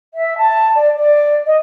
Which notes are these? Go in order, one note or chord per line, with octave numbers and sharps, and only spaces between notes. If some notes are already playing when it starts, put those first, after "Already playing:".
E5
A5
D5
D5
D#5